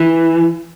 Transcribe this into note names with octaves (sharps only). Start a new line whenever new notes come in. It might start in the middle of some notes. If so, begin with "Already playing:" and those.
Already playing: E3